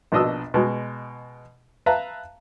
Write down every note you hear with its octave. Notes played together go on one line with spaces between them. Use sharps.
A#1 B2 D4 D#5 D#6 E6
B2 G#3
B4 E5 F5 A5 A#5